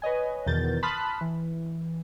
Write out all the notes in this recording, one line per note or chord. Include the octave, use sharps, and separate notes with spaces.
B4 C#5 D#5 G#5
E2 B2 D#3 A#4 G6 A6
A5 B5 C6 D#6 F6 F#6
E3